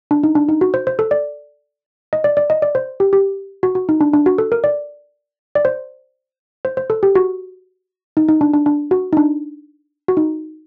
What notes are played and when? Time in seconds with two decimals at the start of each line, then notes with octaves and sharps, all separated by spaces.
0.11 D4
0.23 D#4
0.35 D4
0.49 D#4
0.61 F#4
0.74 C5
0.87 C5
0.99 A4
1.11 D5
2.13 D#5
2.24 D5
2.37 D5
2.50 D#5
2.62 D5
2.75 C5
3.00 G4
3.13 G4
3.63 F#4
3.75 F#4
3.89 D#4
4.01 D4
4.14 D4
4.26 F#4
4.38 A4
4.52 A#4
4.64 D5
5.55 D5
5.65 C5
6.65 C5
6.77 C5
6.90 A4
7.03 G4
7.15 F#4
8.17 D#4
8.29 D#4
8.41 D4
8.54 D4
8.66 D4
8.91 F#4
9.13 D#4
9.17 D4
10.08 F#4
10.17 D#4